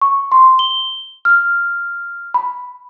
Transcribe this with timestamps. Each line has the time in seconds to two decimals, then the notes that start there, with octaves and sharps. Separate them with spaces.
0.01 C#6
0.32 C6
0.59 G7
1.25 F6
2.34 B5